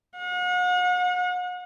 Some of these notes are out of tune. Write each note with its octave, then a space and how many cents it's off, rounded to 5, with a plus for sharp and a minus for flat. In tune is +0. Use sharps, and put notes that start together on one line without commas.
F#5 -40